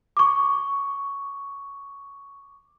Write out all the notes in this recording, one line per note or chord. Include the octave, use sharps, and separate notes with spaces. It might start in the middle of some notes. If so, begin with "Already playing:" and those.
C#6 D6